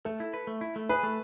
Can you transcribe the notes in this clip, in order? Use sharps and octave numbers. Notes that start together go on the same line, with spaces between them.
A3 A4
E4
B4
A3
E4
A3
G#4 B4
A3